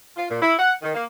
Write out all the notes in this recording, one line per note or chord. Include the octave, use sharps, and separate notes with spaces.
F4
A#2
E4
F#5
D#3
A#3